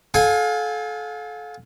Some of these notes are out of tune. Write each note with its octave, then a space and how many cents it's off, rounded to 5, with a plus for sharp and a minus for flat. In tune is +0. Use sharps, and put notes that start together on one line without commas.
A4 -30 F5 +30 G#5 -15